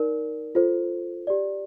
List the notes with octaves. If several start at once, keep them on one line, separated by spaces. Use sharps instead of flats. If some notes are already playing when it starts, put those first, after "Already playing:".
Already playing: D#4 A#4 D5
F4 A4 C5
G4 D5